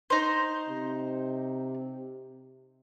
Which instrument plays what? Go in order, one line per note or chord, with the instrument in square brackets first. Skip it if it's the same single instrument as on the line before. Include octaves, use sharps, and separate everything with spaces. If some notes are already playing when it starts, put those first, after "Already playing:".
[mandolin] D#4 C5
[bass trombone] C3